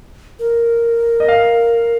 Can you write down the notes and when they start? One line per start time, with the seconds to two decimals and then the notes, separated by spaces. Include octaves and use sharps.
0.39 A#4
1.20 D#5
1.28 F5